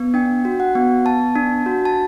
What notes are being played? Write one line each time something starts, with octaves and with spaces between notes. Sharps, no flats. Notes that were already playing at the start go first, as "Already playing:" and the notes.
Already playing: B3
D4 G5
F#4
F#5
B3
B3 A5
D4
F#4
A5